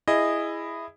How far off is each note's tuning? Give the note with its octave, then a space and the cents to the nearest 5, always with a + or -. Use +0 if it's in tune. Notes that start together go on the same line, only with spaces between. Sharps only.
E4 +5 G#4 -10 D#5 -10